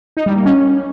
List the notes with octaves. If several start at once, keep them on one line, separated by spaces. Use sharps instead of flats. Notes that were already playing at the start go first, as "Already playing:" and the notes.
D#4
G3
A#3
C#4